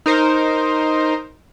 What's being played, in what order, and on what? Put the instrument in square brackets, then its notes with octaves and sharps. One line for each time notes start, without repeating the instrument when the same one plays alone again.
[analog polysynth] D#4 A#4 C5